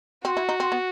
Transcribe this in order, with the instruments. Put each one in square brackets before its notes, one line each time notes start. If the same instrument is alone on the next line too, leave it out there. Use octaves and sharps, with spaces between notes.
[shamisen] C4 [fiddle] F#4
[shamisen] E4
D#4
C4
B3